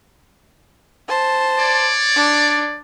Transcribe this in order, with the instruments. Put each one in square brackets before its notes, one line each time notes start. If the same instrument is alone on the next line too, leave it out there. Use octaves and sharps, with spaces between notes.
[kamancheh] C5 A5
[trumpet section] C#5 D5
[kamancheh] D4